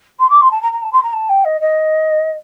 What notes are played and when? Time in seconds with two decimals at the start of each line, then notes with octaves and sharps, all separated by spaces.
0.19 C6
0.30 D6
0.41 C6
0.51 A5
0.62 A#5
0.72 A#5
0.82 A5
0.92 C6
1.03 A#5
1.13 A5
1.29 G5
1.44 D#5
1.60 D#5